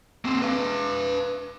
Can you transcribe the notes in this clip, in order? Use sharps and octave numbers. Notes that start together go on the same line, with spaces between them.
A#3 C4
B4 F5